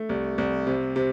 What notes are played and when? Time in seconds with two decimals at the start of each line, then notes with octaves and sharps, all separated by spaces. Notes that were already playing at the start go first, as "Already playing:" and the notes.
Already playing: A3
0.09 C2
0.38 C2
0.67 C3
0.96 C3